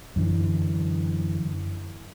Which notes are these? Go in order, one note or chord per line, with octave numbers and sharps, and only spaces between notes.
F#2 D3 E3